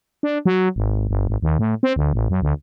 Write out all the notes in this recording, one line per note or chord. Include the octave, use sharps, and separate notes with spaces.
D4
F#3
G#1
G1
G#1
D#2
A2
C4
D2
A1
F#2
D2